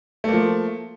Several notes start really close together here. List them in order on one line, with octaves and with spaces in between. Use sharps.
A3 A#3 F3